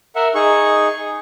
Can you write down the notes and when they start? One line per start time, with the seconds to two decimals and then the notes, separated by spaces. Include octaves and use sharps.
0.16 A#4 E5 F#5
0.35 D#4 G#4 C#6